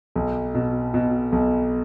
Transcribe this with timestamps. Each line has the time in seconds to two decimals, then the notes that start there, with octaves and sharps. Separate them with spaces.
0.16 B1
0.55 B2
0.94 B2
1.32 B1